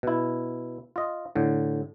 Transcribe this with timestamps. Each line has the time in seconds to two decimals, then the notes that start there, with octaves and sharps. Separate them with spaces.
0.03 B2 E4
0.96 F4 D#5
1.36 A2 D3